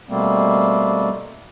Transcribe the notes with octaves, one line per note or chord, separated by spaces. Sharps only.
B2 G3 A3 A#3 C4